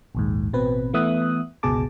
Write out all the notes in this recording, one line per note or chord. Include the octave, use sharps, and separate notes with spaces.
A#1 D#2 G#2
A1 B2 C4 B4
E3 A3 B3 E5 D#6 F#6
G1 C#2 B2 G#4 A5 D6